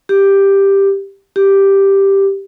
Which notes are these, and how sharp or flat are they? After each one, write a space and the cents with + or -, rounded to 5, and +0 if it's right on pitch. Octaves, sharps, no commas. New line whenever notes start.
G4 +5
G4 +0